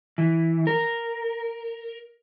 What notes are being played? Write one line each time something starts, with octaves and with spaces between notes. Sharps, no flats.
E3
A#4